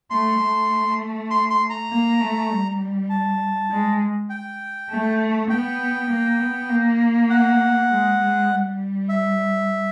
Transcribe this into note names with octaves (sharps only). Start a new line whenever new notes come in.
A3 C6
A3
C6
C6
A#5
A#3
A3
G3
A5
G#3
G5
A3
B3 G5
A#3
B3
A#3
F#5
G#3
G#3
G3
E5